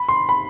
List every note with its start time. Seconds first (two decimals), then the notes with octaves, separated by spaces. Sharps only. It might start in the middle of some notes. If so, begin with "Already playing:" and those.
Already playing: B5
0.08 C6
0.29 B5